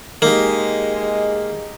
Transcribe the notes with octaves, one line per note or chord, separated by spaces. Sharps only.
G#3 A#3 D#4 G4